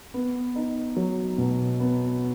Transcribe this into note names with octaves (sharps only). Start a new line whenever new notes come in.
B3
D#4
F#3
B2
B3